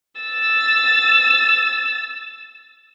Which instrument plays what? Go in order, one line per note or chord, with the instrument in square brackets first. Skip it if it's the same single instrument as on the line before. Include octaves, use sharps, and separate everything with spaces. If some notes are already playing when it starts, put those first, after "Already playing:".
[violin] E6 A6